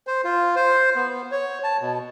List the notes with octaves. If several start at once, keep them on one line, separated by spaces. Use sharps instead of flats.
C5
F4
C5
B3
C#5
A5
B2